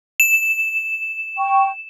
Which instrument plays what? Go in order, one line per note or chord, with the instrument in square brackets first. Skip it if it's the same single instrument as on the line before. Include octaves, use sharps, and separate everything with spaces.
[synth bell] E7
[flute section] G5 C#6